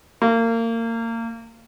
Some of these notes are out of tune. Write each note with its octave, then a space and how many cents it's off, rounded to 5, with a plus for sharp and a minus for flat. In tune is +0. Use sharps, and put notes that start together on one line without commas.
A#3 -30